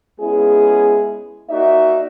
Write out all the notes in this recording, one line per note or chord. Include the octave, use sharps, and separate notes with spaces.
G#3 B3 C#4 E4 G#4
A#3 D#4 F#4 D5 E5